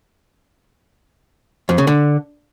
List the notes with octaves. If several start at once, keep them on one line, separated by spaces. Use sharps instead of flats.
F2
C#3
D3